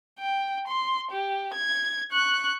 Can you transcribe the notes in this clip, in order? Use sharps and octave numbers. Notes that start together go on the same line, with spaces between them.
G5
C6
G4
G#6
C#6 F#6